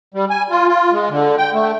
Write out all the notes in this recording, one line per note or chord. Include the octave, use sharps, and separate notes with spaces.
G3
G#5
F4
F4
G#3
D3
G5
A3